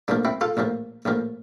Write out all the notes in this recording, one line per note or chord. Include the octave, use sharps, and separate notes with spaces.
A#1 A2 F3 A#3 D4
C4 E4
F4 A4
A#1 A2 F3 A#3
A#1 A2 F3 A#3